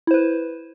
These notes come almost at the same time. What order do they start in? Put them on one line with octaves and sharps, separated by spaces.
E4 C5 B4